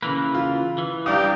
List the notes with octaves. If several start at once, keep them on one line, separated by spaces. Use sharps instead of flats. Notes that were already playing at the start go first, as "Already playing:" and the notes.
C#3 E3 A#3 B4
F4
E3
G3 D4 G4 F5 A#5 D#6